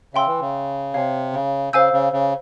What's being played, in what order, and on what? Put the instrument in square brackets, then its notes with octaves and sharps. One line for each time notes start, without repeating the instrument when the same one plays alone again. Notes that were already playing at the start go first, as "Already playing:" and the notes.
[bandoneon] C#3 [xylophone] E5 G5 C6 E6
[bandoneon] E3
C#3
[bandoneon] C3 [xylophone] C#5 F5 G#5
[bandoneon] C#3
[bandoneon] C#3 [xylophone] C5 F5 G#5 E6 G6
[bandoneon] C#3
C#3